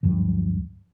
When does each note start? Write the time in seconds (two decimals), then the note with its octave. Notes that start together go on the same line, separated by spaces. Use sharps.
0.03 D2 G2 F3 F#3